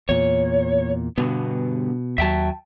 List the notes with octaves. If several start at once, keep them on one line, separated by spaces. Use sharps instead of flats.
E2 A#2 C#5
G2 B2 D3 B3
D#2 F#3 E5 G5 A5